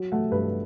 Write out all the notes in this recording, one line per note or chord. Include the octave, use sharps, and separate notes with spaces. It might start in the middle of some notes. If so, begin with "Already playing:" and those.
Already playing: F#3
A3 F#5
G2 B4